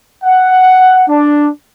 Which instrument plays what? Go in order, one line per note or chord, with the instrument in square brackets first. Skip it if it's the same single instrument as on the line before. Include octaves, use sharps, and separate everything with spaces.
[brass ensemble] F#5
D4